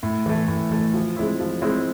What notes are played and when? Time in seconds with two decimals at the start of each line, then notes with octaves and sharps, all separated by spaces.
0.03 A2
0.26 E3 A3
0.48 A2
0.71 E3 A3
0.94 F3
1.16 G#3 C4 E4
1.40 F3
1.62 G#3 C4 E4